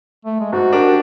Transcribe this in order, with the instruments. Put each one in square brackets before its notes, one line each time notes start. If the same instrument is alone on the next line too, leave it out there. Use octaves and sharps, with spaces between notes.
[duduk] A3
G#3
[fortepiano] G#2 [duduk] F#4
[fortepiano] D4 G4 A#4